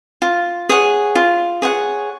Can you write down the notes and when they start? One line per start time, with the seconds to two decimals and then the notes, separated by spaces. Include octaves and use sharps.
0.22 F4
0.69 G#4 C#5 F#5
1.15 F4
1.62 G#4 C#5 F#5